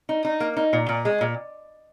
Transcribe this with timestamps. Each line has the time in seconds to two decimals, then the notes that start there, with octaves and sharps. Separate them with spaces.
0.09 D#4
0.25 D#4
0.40 A#3
0.57 D#4
0.73 A#2
0.89 A#2
1.05 G#3
1.21 A#2